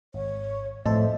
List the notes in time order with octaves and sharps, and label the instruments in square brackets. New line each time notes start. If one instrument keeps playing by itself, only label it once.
[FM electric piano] G#1 [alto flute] C#5
[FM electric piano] F2 A4 C5 [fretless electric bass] A2 [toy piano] D#5 [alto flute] E5